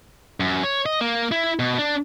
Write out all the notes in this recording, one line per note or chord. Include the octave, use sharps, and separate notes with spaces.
F#2
C#5
D#5
A#3
E4
B2
D4